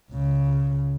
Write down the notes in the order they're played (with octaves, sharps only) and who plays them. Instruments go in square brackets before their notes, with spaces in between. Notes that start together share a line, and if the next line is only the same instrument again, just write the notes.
[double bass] C#2 C#3